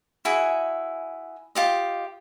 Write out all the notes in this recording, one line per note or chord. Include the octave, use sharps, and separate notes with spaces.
E4 F#4 G#4 E5
F4 G4 D#5